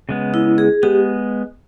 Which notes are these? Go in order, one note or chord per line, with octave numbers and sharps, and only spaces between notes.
C#3 G#3 B3
E4
G#4
G#3 B3 G4